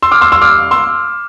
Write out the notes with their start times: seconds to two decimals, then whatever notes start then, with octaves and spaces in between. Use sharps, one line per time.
0.02 C6 E6
0.11 D6 F6
0.21 C6 E6
0.32 C6 E6
0.41 D6 F6
0.71 C6 E6